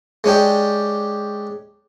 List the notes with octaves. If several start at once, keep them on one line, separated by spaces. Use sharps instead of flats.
G#3 C#4 D4 G4